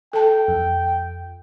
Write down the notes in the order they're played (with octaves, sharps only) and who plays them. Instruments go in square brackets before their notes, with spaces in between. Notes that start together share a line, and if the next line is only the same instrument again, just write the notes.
[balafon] A4 A5 [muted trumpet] G5
[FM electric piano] F2